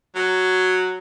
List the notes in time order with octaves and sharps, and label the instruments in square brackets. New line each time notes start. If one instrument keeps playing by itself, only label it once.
[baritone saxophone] F#3